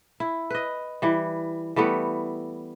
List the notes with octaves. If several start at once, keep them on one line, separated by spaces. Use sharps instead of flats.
E4
B4 D#5
E3 G3
E3 G3 A3 B3